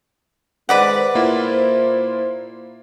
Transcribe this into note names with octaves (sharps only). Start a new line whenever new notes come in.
D#3 G#3 B4 C5 D5 F#5
A#2 A#3 E4 F4 C5